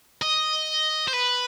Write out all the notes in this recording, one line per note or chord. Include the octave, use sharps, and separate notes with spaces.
D#5
C5
B4